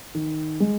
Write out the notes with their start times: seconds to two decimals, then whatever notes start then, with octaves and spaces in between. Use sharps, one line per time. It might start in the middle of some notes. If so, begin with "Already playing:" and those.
0.15 D#3
0.60 G#3